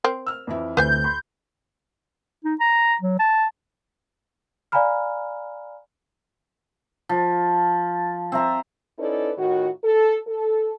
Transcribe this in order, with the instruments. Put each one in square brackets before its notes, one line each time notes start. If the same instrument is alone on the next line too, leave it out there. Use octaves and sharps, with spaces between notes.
[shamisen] C4 A#4 C5
[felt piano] E6 F6
F2 E3 E4
[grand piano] D2 [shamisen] B4 C5 G#5 [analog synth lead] G6
[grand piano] B5 C6
[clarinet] D#4
A#5
F#3
A5
[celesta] D5 F5 G#5 A#5 B5 F6
[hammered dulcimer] F3
C4 E5 A#5
[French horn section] C#4 D#4 E4 A4 B4 D5
A2 D#3 F4 F#4
A4
A4